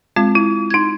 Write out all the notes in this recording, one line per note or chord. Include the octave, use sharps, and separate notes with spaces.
G#3 C4 F4
E4
D#4 G#6